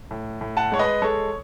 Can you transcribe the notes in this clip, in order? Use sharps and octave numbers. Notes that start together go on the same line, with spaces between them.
A2
A2
F#5 A5
G#3 C#5
B4 D#5
G#3 A4 C#5